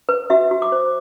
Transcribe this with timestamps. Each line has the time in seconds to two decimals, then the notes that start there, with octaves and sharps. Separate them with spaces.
0.09 B4
0.30 F#4 E5
0.51 F#4
0.62 D6
0.72 C5